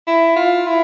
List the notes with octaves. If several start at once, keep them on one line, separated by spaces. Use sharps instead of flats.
E4
F4
E4